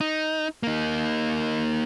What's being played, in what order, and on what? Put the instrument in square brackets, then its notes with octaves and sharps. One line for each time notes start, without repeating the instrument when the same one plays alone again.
[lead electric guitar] D#4
A#3 D#4